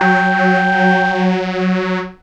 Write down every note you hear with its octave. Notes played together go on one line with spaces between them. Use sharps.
F#3 G5